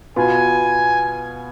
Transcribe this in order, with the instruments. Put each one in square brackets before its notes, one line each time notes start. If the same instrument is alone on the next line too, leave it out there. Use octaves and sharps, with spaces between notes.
[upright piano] B2 B3 F4 [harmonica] G#5